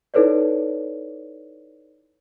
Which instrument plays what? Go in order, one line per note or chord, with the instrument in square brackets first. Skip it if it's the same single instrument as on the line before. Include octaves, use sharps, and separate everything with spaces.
[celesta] D#4 E4 A4 B4 C#5 D5